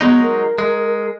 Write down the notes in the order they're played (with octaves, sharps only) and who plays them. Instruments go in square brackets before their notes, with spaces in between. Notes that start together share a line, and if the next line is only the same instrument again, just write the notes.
[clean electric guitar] F#3 G#3 D#4 [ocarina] B3
[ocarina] A#4
[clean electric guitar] G#3